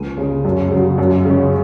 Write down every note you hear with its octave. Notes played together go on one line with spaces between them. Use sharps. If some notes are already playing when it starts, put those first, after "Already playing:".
Already playing: C#2 D#7
C#3 G#3
F#2
C#3 F#3
F#2
C#3 G#3 C#4